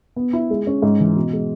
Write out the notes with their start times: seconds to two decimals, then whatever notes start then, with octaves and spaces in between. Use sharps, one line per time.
0.16 B3
0.33 E4
0.50 G#3
0.67 C#4
0.82 G#2
1.00 E3
1.16 B2
1.33 G#3